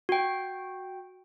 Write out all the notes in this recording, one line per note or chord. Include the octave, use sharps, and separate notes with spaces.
F#4 G5